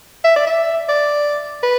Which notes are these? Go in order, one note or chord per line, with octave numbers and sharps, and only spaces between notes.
E5
D5
E5
D5
B4